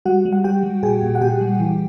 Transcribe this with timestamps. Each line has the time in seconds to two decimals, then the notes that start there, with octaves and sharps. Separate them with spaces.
0.05 G3 F#4 F#5
0.25 G3
0.33 F#5
0.44 G3 G4 G5
0.63 G3
0.83 A#2 G#4 G#5
1.03 A#2
1.15 F#5
1.21 A#2 G4 G5
1.41 G3
1.60 E3